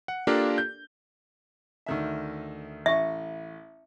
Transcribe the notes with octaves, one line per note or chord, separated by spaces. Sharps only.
F#5
A#3 D4 F4 G4 A4 A#4
G6
D2 D#3 E5
A1 E5 C#6